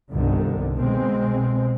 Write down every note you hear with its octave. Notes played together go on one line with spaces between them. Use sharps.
G1 C2 D3 D#3
B2 G#3 C4